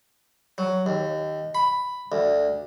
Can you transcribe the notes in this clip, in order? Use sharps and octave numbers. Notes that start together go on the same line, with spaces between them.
F#3
D#2
B5
D2